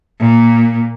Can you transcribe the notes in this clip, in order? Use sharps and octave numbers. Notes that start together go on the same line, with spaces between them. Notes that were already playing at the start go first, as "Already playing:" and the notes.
A#2 A#3